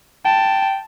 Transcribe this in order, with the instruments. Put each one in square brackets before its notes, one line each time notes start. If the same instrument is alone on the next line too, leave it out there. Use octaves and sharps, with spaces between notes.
[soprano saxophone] G5 [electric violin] A5